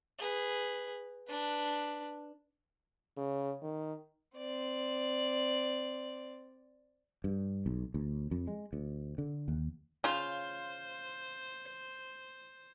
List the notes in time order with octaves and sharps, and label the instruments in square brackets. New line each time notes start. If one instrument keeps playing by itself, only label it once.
[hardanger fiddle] G#4 B4
D4 B4
[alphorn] C#3
D#3
[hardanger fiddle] C4 D5
[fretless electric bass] G2
B1
D2
F2
G#3
D2
D3
D#2
[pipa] C#3 F4 [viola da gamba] C5